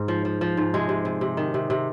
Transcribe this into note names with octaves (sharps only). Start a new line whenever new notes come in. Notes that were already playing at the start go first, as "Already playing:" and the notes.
Already playing: G#2
F3
F3
F3
G#2
C3 G#3
C3
C3
C3
D#3
C3
C3